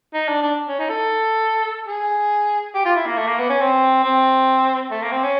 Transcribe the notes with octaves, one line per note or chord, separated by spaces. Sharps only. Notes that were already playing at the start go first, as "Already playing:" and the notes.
D#4
D4
D4
C#4
D#4
A4
G#4
G4
F4
E4
A#3
A3
A#3
B3
C#4
C4
C4
A3
A#3
C4
C#4